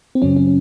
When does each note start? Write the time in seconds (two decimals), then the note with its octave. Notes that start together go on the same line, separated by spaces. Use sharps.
0.15 C4
0.22 F#2 C#3 F#3 C#4
0.37 C#4